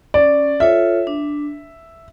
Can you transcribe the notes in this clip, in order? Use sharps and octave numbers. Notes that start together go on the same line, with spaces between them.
C#4 D5
F4 A4 C#5 E5
D4